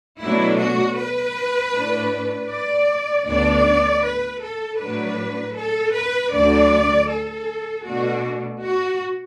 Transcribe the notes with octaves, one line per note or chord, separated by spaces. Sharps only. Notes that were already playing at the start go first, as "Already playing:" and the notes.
B2 F#3 A3 D4 E4
F#4
B4
A2 A3 D4
D5
D2 D3 B3 D4 D5
B4
A4
A2 F#3 D4 B4
A4
B4
D2 D3 F#3 D4 D5
A4
B2 A3 D4 F#4
F#4